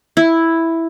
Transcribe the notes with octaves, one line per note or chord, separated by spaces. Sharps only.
E4